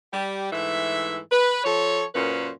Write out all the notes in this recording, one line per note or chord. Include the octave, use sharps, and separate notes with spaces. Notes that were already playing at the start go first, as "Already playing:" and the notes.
G3 G4
G#2 E3 A3 E5
B4
F3 A4 C#5
F#2 A#2 C#4 B4 C5